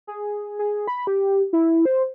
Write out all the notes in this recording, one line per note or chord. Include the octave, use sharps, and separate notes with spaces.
G#4
G#4
B5
G4
E4
C5